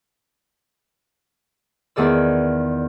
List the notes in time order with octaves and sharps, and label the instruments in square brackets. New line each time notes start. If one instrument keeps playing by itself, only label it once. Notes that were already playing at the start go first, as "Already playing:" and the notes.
[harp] E2 D#3 G#4 D5 E6